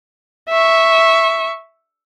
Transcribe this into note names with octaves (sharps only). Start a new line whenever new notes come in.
E5 C#6